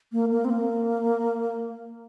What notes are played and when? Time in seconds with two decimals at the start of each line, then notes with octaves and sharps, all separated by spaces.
0.12 A#3
0.31 A#3
0.45 C4
0.50 A#3